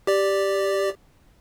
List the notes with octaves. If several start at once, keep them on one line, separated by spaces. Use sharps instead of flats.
G4 D5